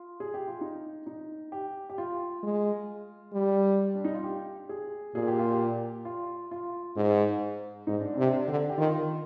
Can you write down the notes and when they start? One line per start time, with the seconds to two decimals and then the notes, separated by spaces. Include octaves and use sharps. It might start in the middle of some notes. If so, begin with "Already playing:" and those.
Already playing: F4
0.20 G#4
0.34 G4
0.48 F4
0.61 D#4
1.06 D#4
1.52 G4
1.90 G4
1.98 F4
2.43 G#3
3.33 G3
3.95 D4
4.04 D#4
4.14 F4
4.24 G4
4.69 G#4
5.15 A#2 G#4
5.28 G4
5.39 F4
5.50 G4
6.05 F4
6.51 F4
6.96 G#2 D#4
7.87 G#2 D#4
8.01 D4
8.14 C3 C4
8.28 D4
8.48 D3
8.69 G4
8.78 D#3 F4